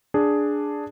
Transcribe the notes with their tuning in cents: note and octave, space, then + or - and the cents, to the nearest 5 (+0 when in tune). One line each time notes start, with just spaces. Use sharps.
D4 +0 G#4 +0